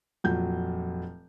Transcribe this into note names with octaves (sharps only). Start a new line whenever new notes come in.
F1 A#2 F#3 G6